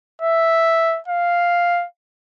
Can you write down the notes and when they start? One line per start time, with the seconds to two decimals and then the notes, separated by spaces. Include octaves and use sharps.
0.22 E5
1.08 F5